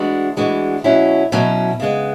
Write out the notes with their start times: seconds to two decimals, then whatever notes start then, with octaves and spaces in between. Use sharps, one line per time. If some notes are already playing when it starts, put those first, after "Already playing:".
Already playing: E3 G#3 D4 F#4
0.37 E3 G#3 D4 F#4
0.84 B2 F#3 C#4 E4
1.32 B2 F#3 C#4 E4
1.80 C#3 G#3 B3